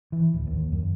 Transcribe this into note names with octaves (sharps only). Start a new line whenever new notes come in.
E3
D1
D#2
F#2